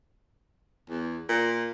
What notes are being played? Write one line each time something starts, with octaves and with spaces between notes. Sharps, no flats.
E2
A#2